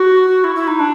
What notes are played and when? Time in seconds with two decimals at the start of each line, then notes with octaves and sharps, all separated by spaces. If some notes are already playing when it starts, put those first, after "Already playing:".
Already playing: F#4
0.44 E4
0.55 E4
0.67 D#4
0.79 D4